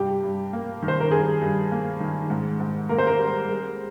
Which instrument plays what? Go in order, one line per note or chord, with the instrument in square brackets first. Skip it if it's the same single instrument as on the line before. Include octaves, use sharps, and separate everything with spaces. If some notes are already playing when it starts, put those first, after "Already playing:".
Already playing: [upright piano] G2 C3 G4
G2
A#3
D#3
C5
A#4
G2 G#4
G2
A#3
D#3
G#2
G#2
A#3 A#4
C5
A#4
G3
G#3